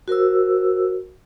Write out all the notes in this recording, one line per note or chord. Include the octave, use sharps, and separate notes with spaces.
F#4 A#4 C5 E6